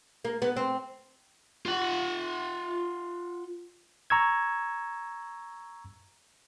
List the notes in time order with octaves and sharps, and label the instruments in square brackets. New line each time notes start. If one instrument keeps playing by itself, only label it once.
[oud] A#3
B3
C4
[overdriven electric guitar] F4 F#5
[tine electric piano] A#5 C#6 E6 G#6